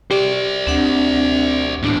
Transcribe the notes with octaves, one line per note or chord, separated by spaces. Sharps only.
G4 C5 D5
D2 C4 D4 F#5
E2 A2 D4